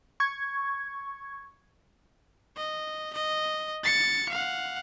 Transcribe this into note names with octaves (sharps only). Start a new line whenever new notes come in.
C#6 G#6
D#5
D#5
A6 C#7
F5 F#5